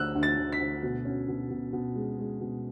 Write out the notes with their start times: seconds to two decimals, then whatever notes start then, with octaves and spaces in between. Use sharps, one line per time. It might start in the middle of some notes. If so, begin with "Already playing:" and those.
Already playing: D2 D3 D4 E6 F#6
0.15 D2
0.23 A6
0.37 D2
0.52 B6
0.60 D2
0.83 B2
1.05 C#4
1.28 B2
1.50 B2
1.73 B2
1.96 G#3
2.19 G#3
2.41 B2